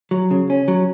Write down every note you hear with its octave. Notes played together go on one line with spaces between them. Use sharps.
F#3
C#3
C#4
F#3